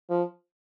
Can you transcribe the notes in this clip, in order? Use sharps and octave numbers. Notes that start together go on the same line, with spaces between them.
F3